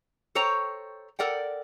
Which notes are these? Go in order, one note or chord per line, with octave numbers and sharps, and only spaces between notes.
A4 C5 C#5 G5 A#5
A4 A#4 D5 F#5 G5